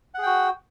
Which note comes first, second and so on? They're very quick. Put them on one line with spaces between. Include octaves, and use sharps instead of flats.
F#5 G#4 G5 F#4